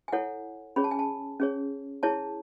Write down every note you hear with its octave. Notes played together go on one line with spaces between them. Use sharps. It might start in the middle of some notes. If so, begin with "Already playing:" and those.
G#5
E4 A4 C#5 F#5
C#4 G#4 C#5 B5
A5
G#5
A5
C#4 G#4 C#5
E4 G#4 C#5 A5